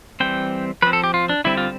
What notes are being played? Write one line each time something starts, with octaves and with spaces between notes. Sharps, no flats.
E3 G3 C4 G5
F3 C4 B4
A4
G4
F4
D4
D3 G3 C4 E4
F4